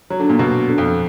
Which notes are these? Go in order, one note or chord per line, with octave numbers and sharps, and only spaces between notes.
F#3
D3
A#2
B2
D3
F2